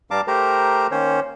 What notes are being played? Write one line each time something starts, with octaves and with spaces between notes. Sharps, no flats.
G2 G3 F5 A5 A#5 D6
A3 G4 A#4 C5 A#5
D#3 A#3 C#4 C5 C#5